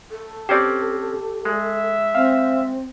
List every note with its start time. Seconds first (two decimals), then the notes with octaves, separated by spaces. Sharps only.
0.11 A4
0.49 C4 C#4 G4 C5 D5
1.45 G#3 E5
2.15 C4 F5